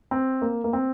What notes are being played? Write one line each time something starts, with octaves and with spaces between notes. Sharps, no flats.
C4
A#3
A#3
C4